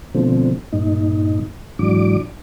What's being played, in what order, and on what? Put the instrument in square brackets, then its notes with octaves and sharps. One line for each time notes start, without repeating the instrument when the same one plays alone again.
[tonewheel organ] B2 D3 F3 A3 C4
G2 A#2 D#4
G#2 E3 F#3 D4 D6